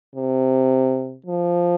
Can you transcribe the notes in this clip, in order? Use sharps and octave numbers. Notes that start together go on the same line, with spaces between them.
C3
F3